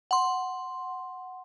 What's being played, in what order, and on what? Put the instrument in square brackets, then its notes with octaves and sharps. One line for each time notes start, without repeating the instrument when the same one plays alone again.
[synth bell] F#5 C6